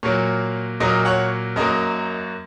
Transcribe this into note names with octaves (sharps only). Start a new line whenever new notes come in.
A#2 F#3 A#3 C#5
A#2 F#3 A#3 A#4 D#5
C#5 F#5
F#2 F#3 A#3 A#4 D#5